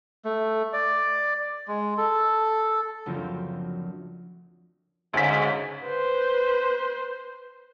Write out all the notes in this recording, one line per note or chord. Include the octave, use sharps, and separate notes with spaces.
A3
D5
G#3
A4
F#1 D2 F3 C4 F4 A#6
D2 G#2 C#3 B6
B4 C5